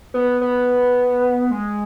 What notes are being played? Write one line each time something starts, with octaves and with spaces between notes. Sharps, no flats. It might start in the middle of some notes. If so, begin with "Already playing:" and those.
B3
B3
G#3